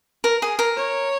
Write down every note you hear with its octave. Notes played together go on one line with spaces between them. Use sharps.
A#4
G#4
A#4
C#5